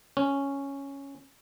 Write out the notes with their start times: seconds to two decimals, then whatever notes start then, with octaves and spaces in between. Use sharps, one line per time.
0.17 C#4